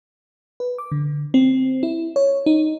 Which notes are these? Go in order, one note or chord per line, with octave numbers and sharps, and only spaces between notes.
B4
D6
D3
C4
E4
C#5
D#4